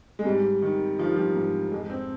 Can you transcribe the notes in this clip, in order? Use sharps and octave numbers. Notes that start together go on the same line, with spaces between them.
G#3
G#2 G3
D#3
D#3 F3
G3
F3
G#2
F2 G#3
C4